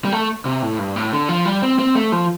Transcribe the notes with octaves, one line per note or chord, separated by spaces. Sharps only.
G3
A3
C3
A2
G2
A2
D3
F3
G3
C4
C4
A3
F3